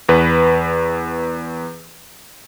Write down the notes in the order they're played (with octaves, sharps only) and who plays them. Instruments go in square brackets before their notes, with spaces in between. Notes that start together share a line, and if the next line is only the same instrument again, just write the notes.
[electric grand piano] E2 B4